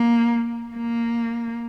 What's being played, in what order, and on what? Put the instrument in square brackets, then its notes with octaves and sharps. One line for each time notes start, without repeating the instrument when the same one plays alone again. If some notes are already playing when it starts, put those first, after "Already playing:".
Already playing: [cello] A#3
A#3